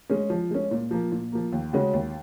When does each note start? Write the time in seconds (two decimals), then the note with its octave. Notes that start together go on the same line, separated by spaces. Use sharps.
0.10 G#3 C#4
0.30 F3
0.51 G#3 C#4
0.71 A#2
0.91 F3 A#3
1.12 A#2
1.32 F3 A#3
1.52 D#2
1.73 C#3 G#3 C#4 F#4
1.93 D#2